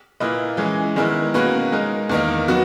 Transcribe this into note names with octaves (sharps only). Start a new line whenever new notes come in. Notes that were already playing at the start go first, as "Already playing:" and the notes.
A#2 A#3 E4 B4 D#5
E3 G#3 C#4 G#4
D#3 G#3 B3 E4 A#4
B2 A#3 C#4 F#4 B4
G#3 D#4 A#4
E2 D#3 A#3 D#4 A#4
F#3 B3 F#4